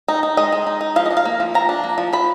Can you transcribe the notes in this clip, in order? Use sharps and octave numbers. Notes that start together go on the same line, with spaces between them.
D#4
D#4
G#3 D#5
G#3
D#4
D#4
F3 F5
D#5
D4
F5
A#3
F3
F3 A#5
D4
A#3
F3
F3 B5